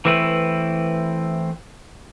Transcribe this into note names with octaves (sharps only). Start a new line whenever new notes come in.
E3 A3 C4 E4 B4